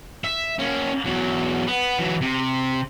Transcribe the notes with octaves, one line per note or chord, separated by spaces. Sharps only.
E5
A#3 C#4
E2 F#3
B3
E3 F#3
C3